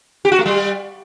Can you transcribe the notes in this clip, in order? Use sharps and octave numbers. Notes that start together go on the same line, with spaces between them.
G4
F#4
A3
G3